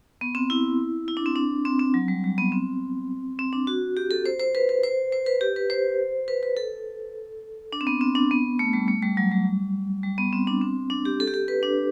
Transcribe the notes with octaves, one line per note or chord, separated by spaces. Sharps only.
B3
C4
E4
E4
D4
C4
D4
C4
C4
F#3
G3
G3
B3
C4
C4
D4
F#4
G4
A4
C5
C5
B4
B4
C5
C5
B4
G4
B4
C5
B4
B4
A4
D4
C4
B3
C4
D4
B3
A3
G3
A3
G3
F#3
G3
G3
B3
C4
D4
C4
D4
G4
A4
G4
A4
B4
D4